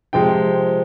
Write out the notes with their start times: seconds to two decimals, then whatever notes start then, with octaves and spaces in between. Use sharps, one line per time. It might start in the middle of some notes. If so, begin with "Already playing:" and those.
0.13 C3 F3 G#3 G5